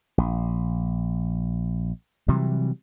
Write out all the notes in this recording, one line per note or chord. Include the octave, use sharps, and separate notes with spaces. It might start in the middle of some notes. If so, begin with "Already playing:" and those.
A#1
C3 E3 F#3 G3